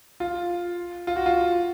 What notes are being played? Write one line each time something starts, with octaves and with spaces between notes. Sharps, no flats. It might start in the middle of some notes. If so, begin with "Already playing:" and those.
F4
F4
F#4
F4